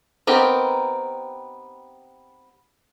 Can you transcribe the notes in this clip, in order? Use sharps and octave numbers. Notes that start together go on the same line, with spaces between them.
B3 C4 D#4 G4 A#4